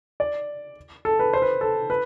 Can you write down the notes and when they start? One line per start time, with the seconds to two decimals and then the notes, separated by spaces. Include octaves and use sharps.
0.20 D5
1.05 A4
1.19 B4
1.33 C5
1.42 B4
1.61 A4
1.90 B4